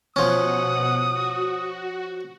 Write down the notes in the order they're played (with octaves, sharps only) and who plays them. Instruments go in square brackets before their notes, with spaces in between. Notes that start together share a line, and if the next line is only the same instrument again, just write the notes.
[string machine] B2 F#5 [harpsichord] F3 C#4 [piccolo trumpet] D#6
[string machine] F#4